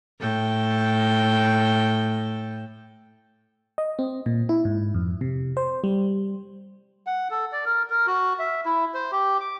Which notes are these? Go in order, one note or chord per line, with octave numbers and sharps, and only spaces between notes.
A2 A4 G5
D#5
C4
A#2
E4
G#2
F2
C3
C5
G3
F#5
A4
D5
A#4
A#4
F#4
E5
E4
C5
G4
D6